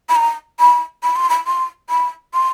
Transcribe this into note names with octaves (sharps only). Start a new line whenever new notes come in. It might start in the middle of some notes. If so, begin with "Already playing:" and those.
B5
A#5
B5
B5
C6
B5
C6
B5
C6